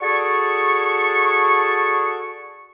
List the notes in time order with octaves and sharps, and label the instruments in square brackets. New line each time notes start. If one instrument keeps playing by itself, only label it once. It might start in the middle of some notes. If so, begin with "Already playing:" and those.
[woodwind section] F#4 G#4 A4 D5 A5 C#6